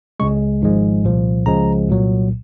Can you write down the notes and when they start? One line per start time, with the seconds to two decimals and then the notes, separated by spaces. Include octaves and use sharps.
0.20 C#2 C#3 G#3 C#6
0.61 G#1 G#2 F3 G#3
1.05 C2 A#2 F3
1.46 C#2 C#3 F3 G#3 A#5
1.89 C2 A#2 F#3